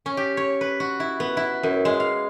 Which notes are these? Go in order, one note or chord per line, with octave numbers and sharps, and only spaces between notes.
C#4
G4
C#5
B4
F#4
E4
B3
E4
F#2
G#3
F5